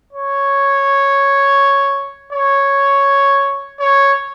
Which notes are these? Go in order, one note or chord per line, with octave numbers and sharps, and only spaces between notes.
C#5
C#5
C#5